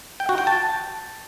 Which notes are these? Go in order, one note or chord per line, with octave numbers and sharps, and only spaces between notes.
G5
F#4
G5
A5